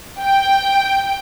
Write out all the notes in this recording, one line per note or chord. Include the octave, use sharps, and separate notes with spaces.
G5